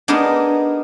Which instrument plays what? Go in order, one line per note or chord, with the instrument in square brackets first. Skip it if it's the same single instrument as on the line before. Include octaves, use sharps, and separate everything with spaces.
[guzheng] B3 D4 D#4 G#4 A#4